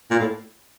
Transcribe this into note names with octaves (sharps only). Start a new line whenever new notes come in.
A#2
A2